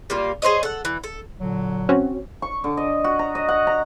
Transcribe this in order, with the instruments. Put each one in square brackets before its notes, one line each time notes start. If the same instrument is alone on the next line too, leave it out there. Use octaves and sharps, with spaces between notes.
[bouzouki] G3 A#3 F4
G#4 C5 C#5 D#5
A4 F#5
E3
A4
[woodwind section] A#2 D3 F#3
[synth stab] C4 C#4 F#4
[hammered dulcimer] C#6
D3
D#5
F#4
A#5
D#5
F#5
A#5